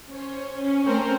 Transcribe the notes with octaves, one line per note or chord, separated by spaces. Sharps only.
C#4 C5 C#5
C#4
A3 C4 C#4 A4 A#4 C5